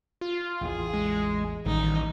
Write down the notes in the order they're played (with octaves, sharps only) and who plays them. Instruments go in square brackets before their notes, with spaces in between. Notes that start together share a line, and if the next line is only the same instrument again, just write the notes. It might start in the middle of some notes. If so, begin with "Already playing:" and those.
[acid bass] F4
[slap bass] A1 E2 [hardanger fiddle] G#4
[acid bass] G#3
[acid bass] A1 [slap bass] D#3 G3 [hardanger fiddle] D#4